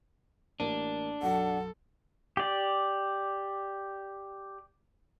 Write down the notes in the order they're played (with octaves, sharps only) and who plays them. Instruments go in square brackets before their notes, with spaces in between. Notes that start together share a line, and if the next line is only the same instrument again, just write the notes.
[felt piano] A1 A#3 D#7 [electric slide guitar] D4
[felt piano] B1 F#2 [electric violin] A4 [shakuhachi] F#5
[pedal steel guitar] G4 D5